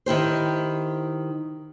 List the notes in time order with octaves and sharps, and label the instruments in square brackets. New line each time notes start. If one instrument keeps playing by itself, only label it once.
[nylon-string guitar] D#3 E4 G4 C5